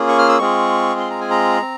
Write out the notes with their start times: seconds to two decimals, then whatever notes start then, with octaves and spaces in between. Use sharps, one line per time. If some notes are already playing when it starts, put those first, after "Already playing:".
Already playing: A#3 C#4 F4 G#4
0.09 C#6
0.19 F6
0.29 E6
0.39 G#3 C4 F4 G#4 C#6
1.00 C6
1.11 A#5
1.21 G#5
1.31 A#5
1.62 C4